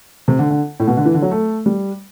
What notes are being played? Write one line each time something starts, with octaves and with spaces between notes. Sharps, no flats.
C3
D3
D3
A2
B2
D3
E3
D3
F#3
A3
G3